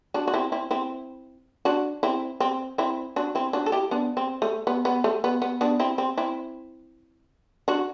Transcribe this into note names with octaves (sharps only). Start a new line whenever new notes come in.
D4 F#4
F#4
C4 E4
C4 E4
C4 E4
D4 F#4
C4 E4
C4
C4 E4
D4 F#4
C4 E4
D4 F#4
A4
E4 G4
B3 D4
C4
A3
B3
B3
A3
B3
B3
B3 D4
C4 E4
C4
C4 E4
D4 F#4